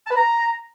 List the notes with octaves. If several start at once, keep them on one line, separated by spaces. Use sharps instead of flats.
A5
B4
A#5